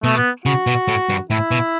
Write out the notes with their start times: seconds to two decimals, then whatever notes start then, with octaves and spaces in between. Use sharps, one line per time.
0.04 B2 A3
0.17 B3
0.46 C#3 F#4
0.67 B2
0.88 A2
1.09 G2
1.30 A2 E4
1.51 B2